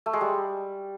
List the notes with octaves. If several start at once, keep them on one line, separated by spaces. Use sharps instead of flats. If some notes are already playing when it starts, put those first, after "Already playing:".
A3
G#3
G3